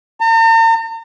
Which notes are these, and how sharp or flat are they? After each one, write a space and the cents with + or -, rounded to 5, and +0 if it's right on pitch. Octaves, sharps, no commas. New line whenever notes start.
A#5 -45